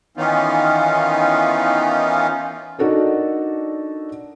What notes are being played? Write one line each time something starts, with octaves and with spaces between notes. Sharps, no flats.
D#3 E3 B3 C#4 D#4 F4
D4 D#4 F#4 A4 A#4